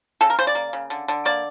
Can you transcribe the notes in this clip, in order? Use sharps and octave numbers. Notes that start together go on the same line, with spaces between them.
C#3 A4
A#4
C#3 C5
D5
A#3
C#3
D3
D3
A#3 D5